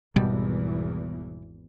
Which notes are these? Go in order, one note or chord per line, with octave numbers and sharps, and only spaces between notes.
G#1 E2 B2 E3 G3